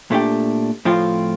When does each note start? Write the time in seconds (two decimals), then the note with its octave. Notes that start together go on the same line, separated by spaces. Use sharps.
0.11 A#2 A3 D4 G4
0.85 A2 F3 C4 F4